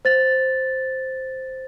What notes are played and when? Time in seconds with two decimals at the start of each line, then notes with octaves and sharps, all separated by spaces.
0.05 C5 A6